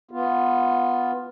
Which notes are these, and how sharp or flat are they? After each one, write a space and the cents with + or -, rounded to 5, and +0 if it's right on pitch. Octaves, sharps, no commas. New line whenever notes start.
B3 +0 F4 +0